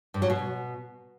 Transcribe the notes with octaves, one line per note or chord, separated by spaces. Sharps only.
G2
F#3
B2